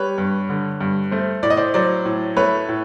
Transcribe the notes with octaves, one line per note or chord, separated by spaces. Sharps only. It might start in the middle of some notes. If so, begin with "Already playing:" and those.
Already playing: G3 B4 C#5
G2
D3
G2
A3 C5
A2 D5
D#5
C5 D5
F#3 C5 D5
A2
A3 B4 C#5
A2